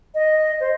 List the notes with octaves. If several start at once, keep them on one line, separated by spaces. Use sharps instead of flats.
D#5
C5